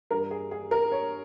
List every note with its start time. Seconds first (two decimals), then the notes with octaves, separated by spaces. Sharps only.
0.11 G2 G3 A#4
0.31 G#4
0.51 G#4
0.71 A#4
0.92 C#5